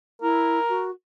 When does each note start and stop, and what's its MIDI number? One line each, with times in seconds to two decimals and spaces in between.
0.22 0.59 64
0.22 0.87 70
0.68 0.90 66